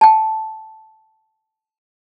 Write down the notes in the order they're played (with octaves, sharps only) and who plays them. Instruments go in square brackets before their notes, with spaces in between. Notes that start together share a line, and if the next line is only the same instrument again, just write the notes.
[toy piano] G5 A5